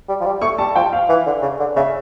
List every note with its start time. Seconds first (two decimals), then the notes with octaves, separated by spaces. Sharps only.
0.09 G3
0.21 F3
0.26 G3
0.42 A3 C#6
0.58 G3 A5
0.76 F3 G5
0.93 F5
1.09 E3
1.26 D3
1.42 C#3
1.60 D3
1.76 C#3 E5